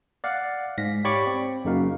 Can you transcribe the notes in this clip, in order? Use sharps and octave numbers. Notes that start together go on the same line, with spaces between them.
D5 F5 F#5
G#2 F5 A#6 B6
G4 C#5 D5 B5 C#6 D6
C4
F#2 C#3 A#3 D#4 F#4 F5